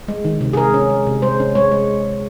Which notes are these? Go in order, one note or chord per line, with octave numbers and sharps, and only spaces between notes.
G#3
D#3
C3
G#4
G#3 A#4
C#4
G#3
C3
G#3 C5
C#4
G#3 C#5
G#3